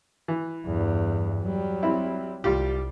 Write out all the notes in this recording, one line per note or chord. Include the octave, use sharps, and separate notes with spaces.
E3
E2 G2
F#3 G3
C4 E4
C2 G3 F4 G4